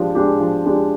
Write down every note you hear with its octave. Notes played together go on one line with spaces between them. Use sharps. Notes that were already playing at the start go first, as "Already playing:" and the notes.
Already playing: F3 G#3 D4 G4
G#3 D4 G4
F3
G#3 D4 G4